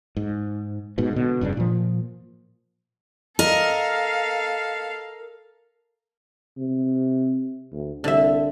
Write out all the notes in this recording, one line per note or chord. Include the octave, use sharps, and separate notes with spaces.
G#2
G#2 B2
B2 D3
F1 G2 C#3 D4
A#2 F3
A4 A#4 D#5 F5
C3
D2
C2 D3 E5